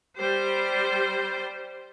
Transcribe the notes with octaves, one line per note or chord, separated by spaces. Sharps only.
G3 C5